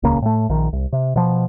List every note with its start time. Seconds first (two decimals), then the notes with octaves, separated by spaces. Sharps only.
0.03 D#1 C#2 C#3 A#3
0.22 A2 A3
0.49 A#1 D#3
0.73 C2
0.93 C3
1.16 B2 F3